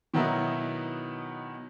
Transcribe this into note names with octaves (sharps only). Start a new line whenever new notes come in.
B2 D#3 F#3 B3 D#4 E4